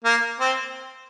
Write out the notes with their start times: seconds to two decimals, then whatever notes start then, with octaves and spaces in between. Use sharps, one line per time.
0.05 A#3
0.40 C4